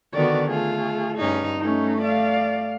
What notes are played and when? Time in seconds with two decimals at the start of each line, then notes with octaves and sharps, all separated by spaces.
0.13 D3 D#3 B3 F#4 D5
0.50 A3 F4 G#4
1.17 G2 C#4 D#4
1.60 A3 C#4 D#4
2.01 D5 F5